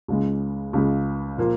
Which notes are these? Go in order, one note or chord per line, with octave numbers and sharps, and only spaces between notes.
C#2 C#3 G#3
C#2 C#3 G#3
A#2 F3 A#3 F4